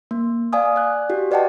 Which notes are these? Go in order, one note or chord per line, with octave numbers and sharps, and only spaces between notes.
A#3
D5 F5 G#5 D#6
D5 F#6
F#4 G4
B4 D5 D#5 F#5 G5 A5